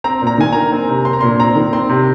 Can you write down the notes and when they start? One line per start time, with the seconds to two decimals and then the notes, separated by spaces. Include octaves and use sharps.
0.04 C4 A#5
0.22 A#2 A#5
0.38 D#3 G#5
0.53 A#3 A#5
0.72 C4
0.89 C3
1.05 C4 C6
1.13 A#5
1.21 A#2 C6
1.39 C4 A#5
1.56 D#3
1.73 C4 C6
1.89 C3